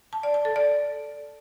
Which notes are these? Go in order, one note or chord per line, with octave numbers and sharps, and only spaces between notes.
A5
D5
A5
A4
D5